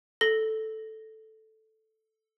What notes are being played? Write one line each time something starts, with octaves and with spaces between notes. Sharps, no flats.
A4 A#6 G7